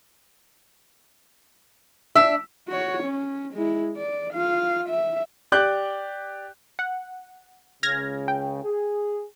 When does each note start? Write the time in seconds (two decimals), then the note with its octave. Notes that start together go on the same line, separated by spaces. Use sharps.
2.15 D4 E5 E6
2.68 F#4 C#5
3.04 C#4
3.54 G#3 E4
3.97 D5
4.33 F4 F5
4.89 E5
5.52 G4 D5 D6 F#6 G6
6.79 F#5
7.83 C#2 C#3 F6 G#6 A#6
8.28 G5
8.64 G#4